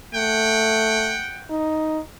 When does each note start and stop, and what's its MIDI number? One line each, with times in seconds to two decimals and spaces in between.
0.15 1.18 57
0.15 1.55 78
0.15 1.55 79
1.50 2.00 63